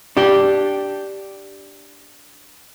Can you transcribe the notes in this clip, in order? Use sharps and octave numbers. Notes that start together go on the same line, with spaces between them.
D4 G4